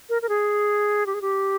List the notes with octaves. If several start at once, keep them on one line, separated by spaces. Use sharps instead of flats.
A#4
A#4
G#4
G4
G#4
G4